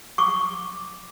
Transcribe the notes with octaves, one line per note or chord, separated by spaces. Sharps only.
C#6 D6